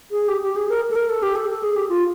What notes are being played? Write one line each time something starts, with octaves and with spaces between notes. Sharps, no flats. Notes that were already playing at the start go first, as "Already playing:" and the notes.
G#4
G4
G4
G#4
A#4
A4
A#4
A4
G4
A4
A4
G#4
G4
F4